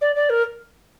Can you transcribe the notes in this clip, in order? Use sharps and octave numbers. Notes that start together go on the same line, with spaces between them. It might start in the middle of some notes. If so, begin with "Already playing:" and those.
D5
D5
A#4